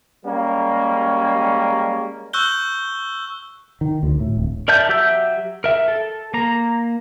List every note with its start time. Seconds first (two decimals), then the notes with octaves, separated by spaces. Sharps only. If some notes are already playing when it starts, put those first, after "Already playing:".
0.25 G3 G#3 A#3 C#4
2.33 C#6 E6 F#6 G6 G7
3.81 D#3
4.03 D2
4.20 A2
4.37 D1
4.68 A#4 D5 E5 A5 G6
4.89 F#3 G4 E5 E6 G6
5.64 A#4 E5
5.88 A4
6.34 A#3 A#5